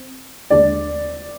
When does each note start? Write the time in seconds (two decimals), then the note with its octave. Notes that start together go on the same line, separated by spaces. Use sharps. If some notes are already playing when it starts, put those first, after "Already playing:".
Already playing: C4
0.50 D#2 D3 G#3 D4 D5